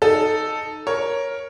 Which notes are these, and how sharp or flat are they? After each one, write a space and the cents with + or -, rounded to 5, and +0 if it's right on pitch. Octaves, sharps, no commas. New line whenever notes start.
D#4 -10 A4 +0
A#4 +5 C#5 +0